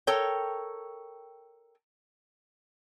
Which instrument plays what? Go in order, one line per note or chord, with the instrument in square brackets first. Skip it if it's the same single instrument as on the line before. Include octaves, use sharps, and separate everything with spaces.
[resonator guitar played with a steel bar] A4 A#4 C#5 G5